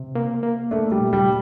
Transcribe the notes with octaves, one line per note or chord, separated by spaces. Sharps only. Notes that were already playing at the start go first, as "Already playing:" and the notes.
Already playing: C3
A#3
A#3
A3 D4
G3
A#2
G3